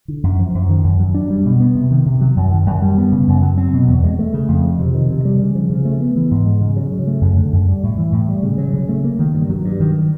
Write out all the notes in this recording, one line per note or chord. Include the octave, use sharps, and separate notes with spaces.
D3
F#2
F3
F#2
D#3
F#2
F#3
D4
G3
B2
B3
C3
D#3
C3
F#3
F#2
D#3
F#2
G3
B3
C#3
F#2
F#3
C4
B2
E2
G#3
A3
C#3
F2
F3
C3
D#3
C3
G3
C#3
F3
C#3
A3
B3
E3
G#2
G#3
C#3
F#3
C#3
A3
F#2
D3
F#2
G3
A2
E3
A2
G3
C#3
F#3
C#3
A3
A#3
D#3
G2
F#3
G2
D#3